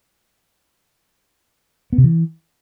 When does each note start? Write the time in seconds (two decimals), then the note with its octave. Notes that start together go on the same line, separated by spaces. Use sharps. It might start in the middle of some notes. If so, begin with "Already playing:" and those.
1.93 B3
1.98 C3
2.04 E3